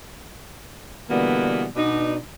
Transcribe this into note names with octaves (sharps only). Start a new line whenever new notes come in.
B2 D3 E3 G3 A#3 B3
B2 D4 D#4